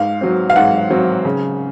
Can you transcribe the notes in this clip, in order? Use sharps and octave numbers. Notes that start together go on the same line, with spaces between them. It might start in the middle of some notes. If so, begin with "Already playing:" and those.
Already playing: G#2 F5
F#3 C4
F5
G#2 F#5
F#3 C4
C#3